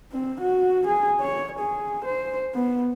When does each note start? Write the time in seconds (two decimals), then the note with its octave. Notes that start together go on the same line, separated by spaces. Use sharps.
0.13 C4
0.41 F#4
0.87 G#4
1.21 C#5
1.60 G#4
2.05 C5
2.55 B3